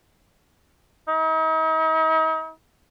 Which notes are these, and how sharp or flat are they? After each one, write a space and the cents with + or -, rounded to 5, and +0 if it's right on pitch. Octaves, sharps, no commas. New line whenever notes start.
D#4 +40